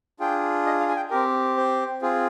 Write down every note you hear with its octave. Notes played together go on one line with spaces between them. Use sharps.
D4 F4 G#4 G5
D#5
F5
G#5
G5
C4 G4 A#4
C5
C4 F4 G#4